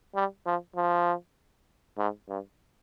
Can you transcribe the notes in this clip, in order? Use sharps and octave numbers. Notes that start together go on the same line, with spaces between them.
G3
F3
F3
G#2
G2